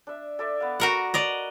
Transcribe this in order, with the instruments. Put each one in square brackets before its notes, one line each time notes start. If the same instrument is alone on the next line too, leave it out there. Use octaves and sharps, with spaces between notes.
[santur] D4 E5
A4 D5 E5
B3 F5
[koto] F#4 A#4 F#5
D5 D#5 A#5